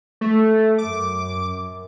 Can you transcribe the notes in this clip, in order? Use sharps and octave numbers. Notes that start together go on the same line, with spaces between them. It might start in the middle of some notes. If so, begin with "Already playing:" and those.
A3
F#2 D6